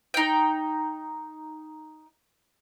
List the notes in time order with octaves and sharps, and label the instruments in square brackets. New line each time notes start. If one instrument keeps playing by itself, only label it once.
[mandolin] D#4 G5